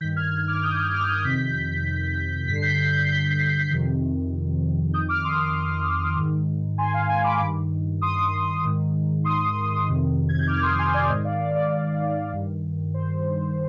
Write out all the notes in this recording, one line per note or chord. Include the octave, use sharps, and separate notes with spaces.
G2 D#3 G6 B6
F6 G#6
D6 F6
D#6 G6
D6 F6
D6 F6
D#6 G6
F2 C3 D#3 G6 B6
G2 D3 B6 C7
G6 B6
G6 B6
G6 B6
F2 C3 D#3
F2 D#3 D#6 G6
D6 F6
C6 D#6
D6 F6
G#2 D#3
G#5 C6
F5 G#5
F5 G#5
B5 D6
G2 D#3
C6 D#6
G#2 D#3
C6 D#6
F2 C3 D#3
G#6
G6
D6 F6
C6 D#6
G#5 C6
D5
G#2 D#3 C5 D#5
D5 F5
D5
D5
G2 D#3
C5